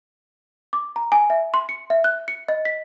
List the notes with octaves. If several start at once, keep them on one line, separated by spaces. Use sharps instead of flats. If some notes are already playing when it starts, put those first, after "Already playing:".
D6
A#5
G#5
E5
C6
C#7
E5
F#6
C#7
D#5
B6